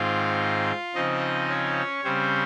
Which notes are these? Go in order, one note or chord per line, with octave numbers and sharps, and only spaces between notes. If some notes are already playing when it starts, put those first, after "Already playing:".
Already playing: G#2 D#3 G#3 C4 F4 F5
C#3 F3 C4 D#4 D#5
C#4 C#5
C#3 G3 C4 C#4 C5